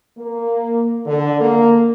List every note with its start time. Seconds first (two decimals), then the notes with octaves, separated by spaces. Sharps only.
0.18 A#3
1.06 D3
1.41 A#3